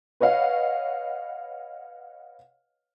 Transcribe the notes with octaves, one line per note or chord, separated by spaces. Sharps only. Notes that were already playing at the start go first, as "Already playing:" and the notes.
B4 C#5 D#5 F5 F#5